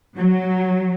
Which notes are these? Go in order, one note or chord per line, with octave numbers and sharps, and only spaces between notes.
F#3